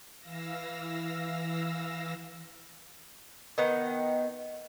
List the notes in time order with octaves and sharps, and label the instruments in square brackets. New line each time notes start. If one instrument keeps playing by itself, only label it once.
[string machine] E3 F5 E6 A#6
[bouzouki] D#3 B3 F#5